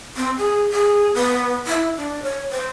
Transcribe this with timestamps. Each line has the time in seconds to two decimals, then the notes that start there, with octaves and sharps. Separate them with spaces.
0.17 C4
0.38 G#4
0.73 G#4
1.15 B3
1.67 E4
1.97 D4
2.23 C#5
2.52 C5